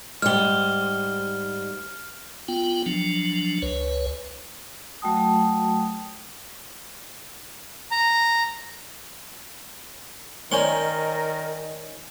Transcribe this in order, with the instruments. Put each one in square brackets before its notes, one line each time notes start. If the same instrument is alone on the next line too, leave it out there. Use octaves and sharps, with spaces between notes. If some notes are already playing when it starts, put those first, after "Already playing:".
[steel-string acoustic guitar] G#2 G3 [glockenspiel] F6 G7
[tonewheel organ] B3 F4 G5
F3 F#3 D4
C#2 B4 C#5
[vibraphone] F#3 A3 F#4 G5 A5 D#6
[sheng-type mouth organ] A#5
[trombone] D#3 [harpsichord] C#4 C6 [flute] A#4 [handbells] C5 D5 D#5